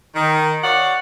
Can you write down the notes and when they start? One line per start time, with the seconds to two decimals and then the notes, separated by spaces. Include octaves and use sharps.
0.15 D#3
0.64 F#4 C#5 D5 F5 F#5